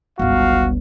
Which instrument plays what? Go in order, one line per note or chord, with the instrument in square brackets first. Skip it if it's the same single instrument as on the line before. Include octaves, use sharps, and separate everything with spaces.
[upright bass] G1 C#2 [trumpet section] F#4 F5